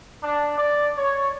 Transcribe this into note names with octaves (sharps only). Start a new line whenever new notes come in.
D4
D5
C#5